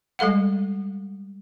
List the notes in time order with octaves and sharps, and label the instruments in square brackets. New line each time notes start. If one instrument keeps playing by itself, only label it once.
[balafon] G3 G#3 A4 F5 F#5